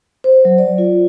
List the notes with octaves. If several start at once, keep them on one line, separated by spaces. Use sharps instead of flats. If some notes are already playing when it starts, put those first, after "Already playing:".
C5
F#3
D5
F4